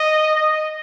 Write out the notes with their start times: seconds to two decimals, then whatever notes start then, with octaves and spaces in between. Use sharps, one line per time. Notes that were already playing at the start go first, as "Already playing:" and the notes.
Already playing: D#5
0.35 D#5